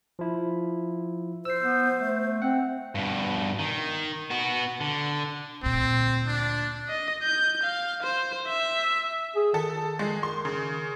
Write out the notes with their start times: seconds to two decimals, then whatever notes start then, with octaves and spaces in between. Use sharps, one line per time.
0.19 F3 E4
1.45 C5 E6 C7
1.63 B3
1.99 A3
2.42 C4 F#5
2.95 G2 B2
3.59 D#3
4.30 B3 F#4
4.80 D3
5.63 D2 A#2 C4
6.27 D4
6.89 D#5
7.22 G6
7.63 F5
8.03 C5
8.47 E5
9.36 G#4
9.54 D#3 A4
9.99 G#3
10.23 C6
10.45 C#3